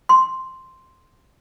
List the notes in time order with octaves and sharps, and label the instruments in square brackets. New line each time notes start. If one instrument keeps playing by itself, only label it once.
[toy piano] C6